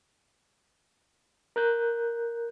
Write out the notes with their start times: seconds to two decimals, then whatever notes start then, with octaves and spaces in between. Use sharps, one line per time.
1.56 A#4 F#6 G6